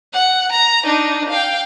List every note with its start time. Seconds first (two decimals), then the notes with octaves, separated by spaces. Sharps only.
0.14 F#5
0.52 A#5
0.85 D4 D#4
1.29 F5 G5